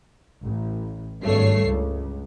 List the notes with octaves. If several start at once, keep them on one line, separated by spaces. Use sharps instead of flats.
A1
G#1 G2 A3 C#5 C7
C#2